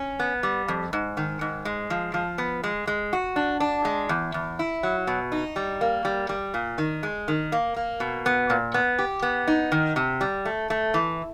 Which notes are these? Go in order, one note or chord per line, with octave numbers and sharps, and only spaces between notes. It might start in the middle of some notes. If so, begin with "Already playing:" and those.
Already playing: C#4
B3
G3
F2
G#2
D#3
G#2
G#3
F3
F3
B3
G#3
G#3
F#4
D4
D4
G#3
E2
E2
E4
F#3
B2
D#4
G3
A#3
G3
G3
A#2
D#3
G#3
D#3
A#3
A#3
B2
B3
A#2
B3
G4
B3
D#4
D#3
C3
G3
A3
A3
E3